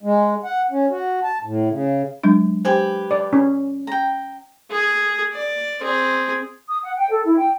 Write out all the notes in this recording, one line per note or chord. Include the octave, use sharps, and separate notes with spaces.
G#3
F#5
C#4
F#4
A5
A2
C#3
F#3 G#3 D4
G4 B4 C5 G#5
D5
C#4
G5 A#5
G#4
D5
C4 G#4
D#6
F#5
G5
A4
E4
G5